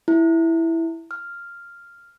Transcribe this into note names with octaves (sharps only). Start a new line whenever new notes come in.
E4
F6